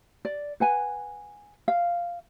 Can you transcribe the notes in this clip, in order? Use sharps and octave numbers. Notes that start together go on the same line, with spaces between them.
D5
B4 F#5 G#5
F5